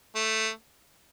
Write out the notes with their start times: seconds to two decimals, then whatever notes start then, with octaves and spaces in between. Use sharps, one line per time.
0.15 A3